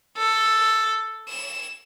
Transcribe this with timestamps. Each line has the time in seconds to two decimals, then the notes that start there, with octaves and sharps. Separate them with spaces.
0.18 A4
1.29 E7